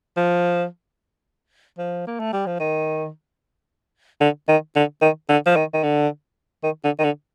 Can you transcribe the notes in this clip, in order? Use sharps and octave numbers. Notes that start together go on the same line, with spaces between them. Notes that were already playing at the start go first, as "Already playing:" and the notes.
F3
F3
A#3
A3
G3
F3
D#3
D3
D#3
D3
D#3
D3
F3
D#3
D#3
D3
D#3
D3
D#3
D3